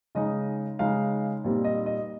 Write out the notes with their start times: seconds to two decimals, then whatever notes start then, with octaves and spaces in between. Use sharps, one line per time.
0.15 C#3 G#3 D#4 D#5
0.79 C#3 G#3 D#4 F5
1.44 A#2 G3 C4 D#4
1.64 D#5
1.86 D#5